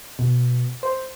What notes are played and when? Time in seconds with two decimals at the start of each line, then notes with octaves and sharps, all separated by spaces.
0.19 B2
0.83 C5